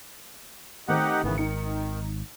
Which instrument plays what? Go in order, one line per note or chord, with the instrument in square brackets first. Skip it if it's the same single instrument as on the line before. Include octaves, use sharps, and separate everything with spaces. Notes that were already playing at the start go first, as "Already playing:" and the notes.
[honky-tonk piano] D#3 A3 C4 [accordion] D#4 G4 F#5
[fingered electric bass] G#1 [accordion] C#3 E3 B3
[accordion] D#3 [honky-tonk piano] D#4 C#7